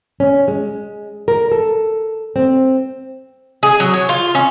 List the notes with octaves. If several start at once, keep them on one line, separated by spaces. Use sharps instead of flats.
C#4
G#3
A#4
A4
C4
G#4
F#3
C#5
F4
C#4